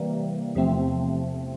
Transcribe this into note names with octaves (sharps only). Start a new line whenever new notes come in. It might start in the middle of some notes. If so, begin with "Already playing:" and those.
Already playing: C3 E3 G3 A#3
E2 C3 F3 A3 C4